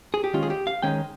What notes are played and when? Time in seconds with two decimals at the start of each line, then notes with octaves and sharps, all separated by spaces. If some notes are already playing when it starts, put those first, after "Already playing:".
0.14 G#4
0.24 G4
0.33 D#3 G#3 C#4 F4
0.43 G#4
0.50 G4
0.67 F5
0.82 D#3 G#3 C#4 G5